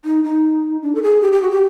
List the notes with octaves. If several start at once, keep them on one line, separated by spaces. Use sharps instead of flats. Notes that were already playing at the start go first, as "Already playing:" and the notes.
D#4
D#4
D4
A4
G#4
G4
G4
F#4
G4